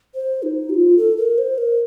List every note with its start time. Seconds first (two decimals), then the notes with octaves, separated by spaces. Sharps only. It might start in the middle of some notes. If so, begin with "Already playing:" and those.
0.15 C5
0.43 D#4
0.70 G4
0.74 F4
0.97 A4
1.17 A#4
1.38 C5
1.58 A#4